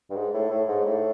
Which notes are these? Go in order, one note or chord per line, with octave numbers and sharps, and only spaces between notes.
G2
G#2
A2
A2
G#2
A2